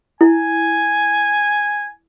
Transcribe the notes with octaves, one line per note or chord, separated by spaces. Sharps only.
E4 G#5